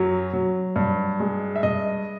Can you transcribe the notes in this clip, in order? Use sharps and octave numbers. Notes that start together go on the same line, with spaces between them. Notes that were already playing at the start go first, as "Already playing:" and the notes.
Already playing: F#2 F#3
F#3
G2
G#3
E5
G2 D#5